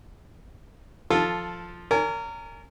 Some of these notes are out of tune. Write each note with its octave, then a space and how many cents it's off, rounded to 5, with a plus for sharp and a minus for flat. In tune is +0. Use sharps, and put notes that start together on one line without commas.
F3 +0 F4 +0 A4 +0
A#4 -25 C#5 +45 G#5 +0